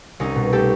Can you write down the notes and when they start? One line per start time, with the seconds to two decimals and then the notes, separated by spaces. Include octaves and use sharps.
0.20 C2 C#4 D#4
0.36 B2
0.52 A3 G4 A4